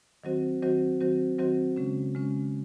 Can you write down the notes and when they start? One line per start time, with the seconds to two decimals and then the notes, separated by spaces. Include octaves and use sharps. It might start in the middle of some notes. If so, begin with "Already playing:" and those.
0.24 D#3 F#3 C4 F#4 C5
0.62 D#3 F#3 C4 F#4 C5
1.01 D#3 F#3 C4 F#4 C5
1.39 D#3 F#3 C4 F#4 C5
1.76 C#3 G#3 C#4
2.15 C#3 G#3 C#4